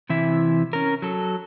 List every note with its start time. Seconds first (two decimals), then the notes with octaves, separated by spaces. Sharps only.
0.09 C3 E3 E4 E5
0.73 C#4 A#4
1.02 F#3 A4